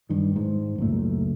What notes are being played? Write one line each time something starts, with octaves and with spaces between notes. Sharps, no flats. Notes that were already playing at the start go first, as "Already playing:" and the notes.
G2 D#3
G#2
C#2 F#2 A#2 A3